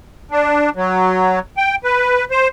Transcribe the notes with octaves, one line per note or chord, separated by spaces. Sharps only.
D4
F#3
G5
B4
C5